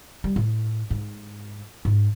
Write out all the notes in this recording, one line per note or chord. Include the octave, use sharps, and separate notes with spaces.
G3
A2
G#2
G#2